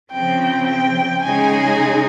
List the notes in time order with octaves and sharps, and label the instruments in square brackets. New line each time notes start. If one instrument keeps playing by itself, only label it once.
[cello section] C#3 F3 C4 [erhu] G5
[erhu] G5
[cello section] C#3 G#3 D#4 G#4 [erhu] G#5